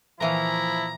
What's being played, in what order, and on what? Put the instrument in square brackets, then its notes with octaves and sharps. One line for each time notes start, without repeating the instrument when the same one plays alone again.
[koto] A#2 E3 F5 [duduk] F3 [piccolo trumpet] E4 [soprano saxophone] A#5